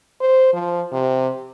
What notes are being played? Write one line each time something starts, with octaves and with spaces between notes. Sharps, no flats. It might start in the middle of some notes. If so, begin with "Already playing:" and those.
C5
F3
C3